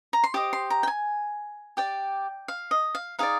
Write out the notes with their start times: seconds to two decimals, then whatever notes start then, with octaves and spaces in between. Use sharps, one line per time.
0.13 A#5
0.24 C6
0.34 G4 C5 D#5 D6
0.53 C6
0.70 A#5
0.83 G5
0.87 G#5
1.77 G4 D5 G5
2.48 F5
2.71 D#5
2.95 F5
3.19 D#4 G#4 D5 F5